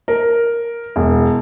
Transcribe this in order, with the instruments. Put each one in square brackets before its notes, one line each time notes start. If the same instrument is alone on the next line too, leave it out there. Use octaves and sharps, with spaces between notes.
[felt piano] A#4
E1